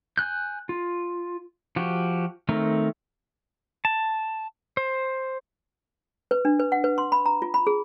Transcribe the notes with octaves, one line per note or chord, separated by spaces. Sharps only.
G#5 F#6 G6
F4
F3 F#4 G4
D#3 A3 C4 A#4
A5
C5
B4
D4
B4
F#5
B4
C6
B5
A#5
F4
B5
G#4